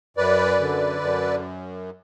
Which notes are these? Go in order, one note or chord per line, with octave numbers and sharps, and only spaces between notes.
F#2 B4 D5
D3
F#2